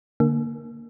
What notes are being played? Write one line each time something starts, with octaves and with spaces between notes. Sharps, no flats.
D3 A#3